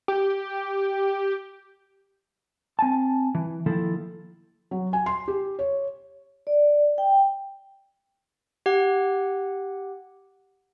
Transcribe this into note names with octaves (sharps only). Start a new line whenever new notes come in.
G4
C4 G#5 A5
E3
D#3 F3 A#3 E4 A4
F#3
G#5
C6
G4
C#5
D5
G5
G4 F#5